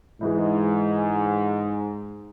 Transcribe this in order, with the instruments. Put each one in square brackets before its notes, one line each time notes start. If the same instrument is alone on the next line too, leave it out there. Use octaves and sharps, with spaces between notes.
[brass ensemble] G#2 [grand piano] E3 G#3 E4